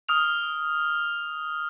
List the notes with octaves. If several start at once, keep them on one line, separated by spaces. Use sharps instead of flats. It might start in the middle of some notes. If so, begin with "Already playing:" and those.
D#6 F6 F7